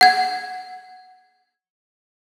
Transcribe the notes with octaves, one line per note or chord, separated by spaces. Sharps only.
F#5 G#6